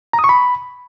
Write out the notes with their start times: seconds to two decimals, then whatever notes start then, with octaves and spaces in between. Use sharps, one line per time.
0.13 A#5
0.19 D#6
0.24 C#6
0.29 B5